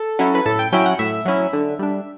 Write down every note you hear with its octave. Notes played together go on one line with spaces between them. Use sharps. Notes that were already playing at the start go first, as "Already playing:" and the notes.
Already playing: A4
F#3 C#4 E4
B4
A2 A4
G5
F#3 C#4 E4 G5
F#5
A2 E5
F#3 C#4 E4
D3
G3 D4